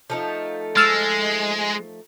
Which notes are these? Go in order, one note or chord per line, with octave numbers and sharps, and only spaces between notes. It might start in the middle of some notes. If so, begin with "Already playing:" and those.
F3 A3 D#4
G#3 E6 F6 A6